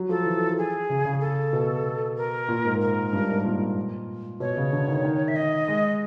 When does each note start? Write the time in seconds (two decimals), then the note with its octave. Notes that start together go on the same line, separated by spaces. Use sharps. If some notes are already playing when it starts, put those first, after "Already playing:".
Already playing: F#3
0.09 F3 A4
0.26 E3
0.58 G#4
0.89 C#3
1.05 C#3
1.21 A4
1.53 B2
2.17 A#4
2.49 A#2
2.65 G#2
2.81 A#4
3.13 G2
3.29 G#2
3.45 A#2
4.40 B2 C#5
4.57 C#3
4.73 D3
4.88 D#3
5.04 D#3
5.28 E5
5.36 D#5
5.68 G#3